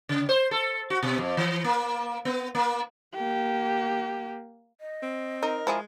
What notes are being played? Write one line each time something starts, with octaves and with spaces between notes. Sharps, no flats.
C#3
C5
A4
F#4
B2
F2
E3
A#3
B3
A#3
A#3 G4
D#5
C4
D#4 A#4
F3 G#3 E4 G#4